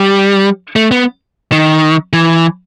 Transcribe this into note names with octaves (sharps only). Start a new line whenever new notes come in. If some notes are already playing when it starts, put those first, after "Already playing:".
Already playing: G3
A3
B3
D#3
E3